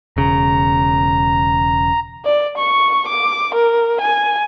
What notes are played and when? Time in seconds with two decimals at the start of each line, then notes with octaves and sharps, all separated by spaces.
0.17 E1 C#3 A#5
2.25 D5
2.58 C#6
3.08 D6
3.55 A#4
4.01 G#5